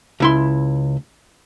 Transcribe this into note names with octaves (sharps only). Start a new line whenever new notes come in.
C#2 E4 C6